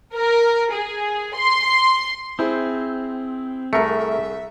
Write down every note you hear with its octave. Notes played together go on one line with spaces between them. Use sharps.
A#4
G#4
C6
C4 E4 G#4 C5
C2 A3 G#4 A#4 E5 C#7